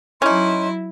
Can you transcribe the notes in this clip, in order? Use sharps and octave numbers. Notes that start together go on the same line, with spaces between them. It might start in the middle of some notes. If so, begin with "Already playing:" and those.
F#3 C#4 D#4 E4 C6